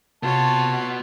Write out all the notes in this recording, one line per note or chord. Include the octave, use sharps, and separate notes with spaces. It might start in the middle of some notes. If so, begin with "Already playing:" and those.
C3 B3 F4 F#4 C#5 A5